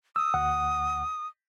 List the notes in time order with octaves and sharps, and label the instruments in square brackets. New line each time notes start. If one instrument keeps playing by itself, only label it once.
[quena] D#6 [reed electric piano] E6
[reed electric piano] D2 F#5